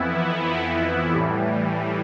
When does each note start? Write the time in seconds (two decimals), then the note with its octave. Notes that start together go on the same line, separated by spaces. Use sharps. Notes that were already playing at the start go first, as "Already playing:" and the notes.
Already playing: F2 E3 B3 E4
1.13 A2 E3 G3